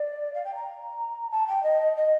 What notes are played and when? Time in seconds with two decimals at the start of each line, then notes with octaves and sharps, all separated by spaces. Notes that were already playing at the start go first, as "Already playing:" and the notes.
Already playing: D5
0.34 F5
0.44 G5
0.55 A#5
1.30 A5
1.47 G5
1.63 D#5
1.96 D#5